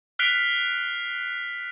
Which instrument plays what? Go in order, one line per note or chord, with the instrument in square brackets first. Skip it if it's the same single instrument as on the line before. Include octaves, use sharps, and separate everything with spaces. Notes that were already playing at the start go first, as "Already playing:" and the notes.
[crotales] F6 F#6 B6 C7 D7 F7